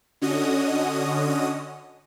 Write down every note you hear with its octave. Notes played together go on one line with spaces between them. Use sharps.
D3 C#4 F#4 D#5 D#6